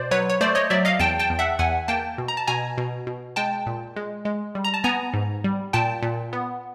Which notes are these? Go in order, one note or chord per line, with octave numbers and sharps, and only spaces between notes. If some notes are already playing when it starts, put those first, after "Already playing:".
Already playing: B2 C5 D5
F#3 B4 C#5
C#5
A3 C5 D5
C#5 D#5
F#3 D5 E5
D#5 F5
E2 G5 A5
G5 A5
E2
E5 F#5
E2 F#5 G#5
A#3 G5 A5
B2
A#5
A5
B2 G#5 A#5
B2
B2
G#3 G5 A5
A#2
G#3
G#3
G3
A#5
A5
B3 G#5 A#5
G#2
G3
A#2 G5 A5
A#2
B3